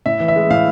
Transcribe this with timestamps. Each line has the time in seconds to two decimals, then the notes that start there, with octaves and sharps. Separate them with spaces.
0.06 A2 E5
0.20 E3
0.28 E5
0.36 G#3
0.50 A2 F5